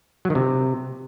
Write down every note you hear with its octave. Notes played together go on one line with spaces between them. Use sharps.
F#3
D#3
C3